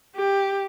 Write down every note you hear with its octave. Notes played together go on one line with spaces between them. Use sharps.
G4